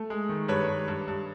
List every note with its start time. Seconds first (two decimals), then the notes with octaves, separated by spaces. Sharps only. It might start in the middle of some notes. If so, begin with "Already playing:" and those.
Already playing: A3
0.10 G#3
0.29 D#3
0.48 G2 B4 C#5
0.68 G2
0.88 G2
1.08 G2